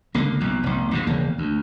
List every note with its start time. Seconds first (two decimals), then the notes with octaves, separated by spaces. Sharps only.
0.14 C#2 D3 A#3
0.40 B1 F2
0.63 F1 B1
0.91 D#2 G#2 B2
1.07 E1 D#2 C#3 A#3
1.38 D2